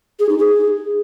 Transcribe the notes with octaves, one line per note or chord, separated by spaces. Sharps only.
G#4
D#4
G#4